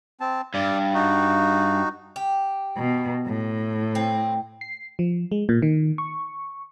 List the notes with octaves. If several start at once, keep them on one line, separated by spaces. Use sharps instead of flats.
C4 A5
G2 D5
D#4 F#4
G4
B2
A2
C4
C7
F3
G#3
A#2
D#3
C#6